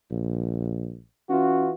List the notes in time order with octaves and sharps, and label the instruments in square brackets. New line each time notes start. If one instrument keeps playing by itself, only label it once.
[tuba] A#1
[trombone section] E3 F4 F#4 [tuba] C#4